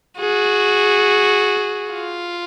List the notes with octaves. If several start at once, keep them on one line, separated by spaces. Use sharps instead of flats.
F#4 G#4
F4